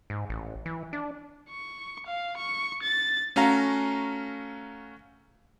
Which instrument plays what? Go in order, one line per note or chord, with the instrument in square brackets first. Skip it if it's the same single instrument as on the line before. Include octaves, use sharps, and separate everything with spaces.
[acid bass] G#2
A1
E3
D4
[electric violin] C#6
F5
C#6
A6
[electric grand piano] A3 C#4 F#4 F5 A#5